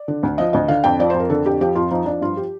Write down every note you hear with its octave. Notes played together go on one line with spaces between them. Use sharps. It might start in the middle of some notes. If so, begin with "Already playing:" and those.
Already playing: D5
D3
D2
F3 D#5
D2 D#5
D3 F5
F2 G5
F3 D5
F2 C5
A#4
D3 A4
F2 G4
F3 G4
F2 F4
F3 D#4
F3 D4
G2 F4
G4